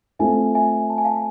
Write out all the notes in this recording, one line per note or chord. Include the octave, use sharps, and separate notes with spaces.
A3 C4 F4 A4 E5 G#5
E5 G#5
A5
G#5
F5 A5